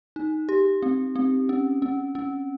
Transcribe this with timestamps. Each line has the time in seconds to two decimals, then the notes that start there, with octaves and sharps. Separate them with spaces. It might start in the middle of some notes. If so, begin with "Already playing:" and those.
0.16 D#4
0.49 G4
0.83 C4
1.16 C4
1.49 C#4
1.82 C#4
2.15 C#4